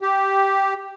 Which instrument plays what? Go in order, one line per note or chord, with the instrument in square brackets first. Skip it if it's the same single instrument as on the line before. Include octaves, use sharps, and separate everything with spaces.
[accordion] G4